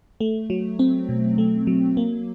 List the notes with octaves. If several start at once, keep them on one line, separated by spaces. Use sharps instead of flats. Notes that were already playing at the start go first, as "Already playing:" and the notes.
A3
F#3
C4
B2
A3
F#3
A#3